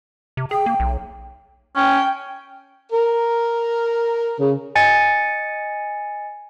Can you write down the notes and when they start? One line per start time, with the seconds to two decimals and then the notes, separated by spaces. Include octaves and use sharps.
0.37 C3
0.51 G#4 G5
0.66 A#3
0.80 B1
1.76 C#4 G5
2.92 A#4
4.40 C#3
4.75 D#5 G#5 A6 C#7